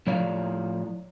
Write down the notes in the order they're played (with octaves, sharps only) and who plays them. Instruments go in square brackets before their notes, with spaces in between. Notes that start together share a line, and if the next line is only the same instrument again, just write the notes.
[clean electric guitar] A2 F3 E4 C#5 D5 F5